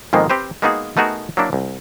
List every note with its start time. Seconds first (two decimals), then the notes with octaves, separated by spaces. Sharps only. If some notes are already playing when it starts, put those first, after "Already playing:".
0.13 F2 G#2 D#3 G#3 A#3 B3
0.30 C4 G4 B4 C5
0.62 G#3 A#3 B3 D#4 F#4 G#4
0.97 A3 B3 D#4 F#4 G#4 A#4
1.37 F#3 A#3 D4 E4
1.53 C2